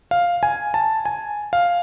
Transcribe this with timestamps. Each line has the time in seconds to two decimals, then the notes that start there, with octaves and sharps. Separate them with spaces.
0.11 F5
0.43 G#5
0.74 A5
1.05 G#5
1.53 F5